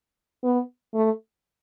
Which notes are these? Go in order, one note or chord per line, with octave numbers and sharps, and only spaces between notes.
B3
A3